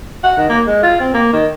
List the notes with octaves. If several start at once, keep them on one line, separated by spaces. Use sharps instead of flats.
F#5
D#3
A#3
G#3
F4
C4
A#3
D#3